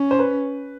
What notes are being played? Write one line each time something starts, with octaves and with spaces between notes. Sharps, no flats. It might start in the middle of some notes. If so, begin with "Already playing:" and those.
Already playing: C#4
C5
B4